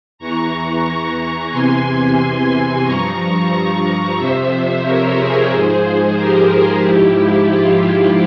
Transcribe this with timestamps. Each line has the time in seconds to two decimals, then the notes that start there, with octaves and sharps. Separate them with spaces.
0.18 E2 E3 A#5 C#6
0.84 A#5 C#6
1.51 E2 C3 E3 G#5 C6
2.84 G2 F3 A#5 C#6
4.16 F2 C3 F3 C5 E5
4.83 A#4 C#5
5.16 G#4 C5
5.50 G#2 F3 G#4 C5
6.16 G4 A#4
6.82 G#2 F3 E4 G4
7.49 F4